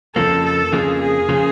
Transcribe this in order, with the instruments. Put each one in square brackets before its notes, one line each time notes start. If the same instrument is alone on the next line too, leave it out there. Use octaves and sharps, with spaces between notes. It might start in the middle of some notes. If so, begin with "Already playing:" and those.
[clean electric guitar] F2 C#3 F3 A#3 [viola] A4
[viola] A4
[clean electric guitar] F2 C#3 F3 A#3 [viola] G#4
[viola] G#4
[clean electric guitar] C#3 F3 A#3